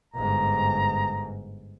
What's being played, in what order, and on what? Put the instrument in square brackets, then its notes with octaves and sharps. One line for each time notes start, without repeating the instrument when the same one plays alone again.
[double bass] G1 G#2 [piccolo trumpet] A#5